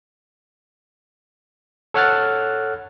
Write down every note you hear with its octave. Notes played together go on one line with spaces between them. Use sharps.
A4 C#5 F#5 F6 F#6 A6